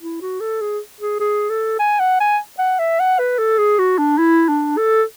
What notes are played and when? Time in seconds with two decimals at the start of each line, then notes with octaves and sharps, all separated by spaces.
0.01 E4
0.21 F#4
0.40 A4
0.61 G#4
1.01 G#4
1.20 G#4
1.50 A4
1.79 G#5
2.00 F#5
2.20 G#5
2.59 F#5
2.79 E5
2.99 F#5
3.19 B4
3.39 A4
3.58 G#4
3.79 F#4
3.98 D4
4.18 E4
4.48 D4
4.78 A4